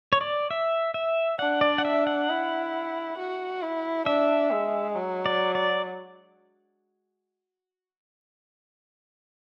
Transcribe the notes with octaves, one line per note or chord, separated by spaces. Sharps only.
C#5
D5
E5
E5
D4 F#5
D5
F#5
E5
F#5
E4
F#4
E4
D4 E5
G#3
F#3
D5
D5